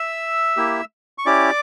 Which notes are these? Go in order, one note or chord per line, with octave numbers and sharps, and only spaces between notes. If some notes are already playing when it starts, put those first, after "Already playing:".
Already playing: E5 E6
A#3 E4 G4
C#6
C#4 E4 G4 D5 D6